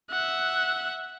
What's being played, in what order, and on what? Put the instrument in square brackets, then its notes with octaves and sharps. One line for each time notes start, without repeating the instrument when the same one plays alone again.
[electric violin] E5 F#5